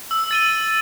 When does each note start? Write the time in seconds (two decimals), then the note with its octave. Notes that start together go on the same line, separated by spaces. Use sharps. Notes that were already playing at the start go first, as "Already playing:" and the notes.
0.11 E6
0.31 A6 D#7 G7